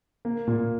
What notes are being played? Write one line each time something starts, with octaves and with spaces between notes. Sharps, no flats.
A#3
A#2